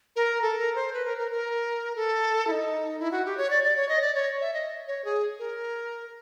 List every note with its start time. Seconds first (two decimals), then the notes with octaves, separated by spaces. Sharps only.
0.16 A#4
0.42 A4
0.59 A#4
0.75 C5
0.93 B4
1.05 A#4
1.18 A#4
1.31 A#4
1.96 A4
2.47 E4
2.52 D#4
3.00 E4
3.11 F#4
3.25 G4
3.37 C#5
3.50 D5
3.64 D5
3.76 C#5
3.89 D#5
4.02 D5
4.14 C#5
4.41 E5
4.54 D#5
4.88 C#5
5.05 G#4
5.39 A#4